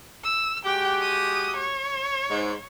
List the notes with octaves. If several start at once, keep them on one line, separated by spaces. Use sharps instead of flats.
E6
G#3 F#4 G4 G5
D#6
C#5
G#2